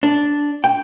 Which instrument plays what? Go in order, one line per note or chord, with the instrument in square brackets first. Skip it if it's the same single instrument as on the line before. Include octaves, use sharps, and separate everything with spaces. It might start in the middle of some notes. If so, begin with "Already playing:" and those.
[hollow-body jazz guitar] D4
G5